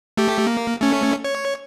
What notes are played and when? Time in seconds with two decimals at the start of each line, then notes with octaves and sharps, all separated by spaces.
0.17 A3 G4
0.47 A#3
0.81 A3 C#4
1.24 C#5